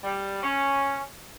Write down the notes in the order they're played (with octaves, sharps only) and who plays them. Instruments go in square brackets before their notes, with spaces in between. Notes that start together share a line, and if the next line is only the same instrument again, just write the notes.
[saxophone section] G3
C#4